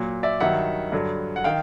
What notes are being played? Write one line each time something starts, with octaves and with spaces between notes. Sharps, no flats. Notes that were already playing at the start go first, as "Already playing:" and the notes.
Already playing: A#2 F#3
D5 E5
G2 D#3 F#3 E5 F#5
G2 D3 F#3
F#5
D#3 F5 G5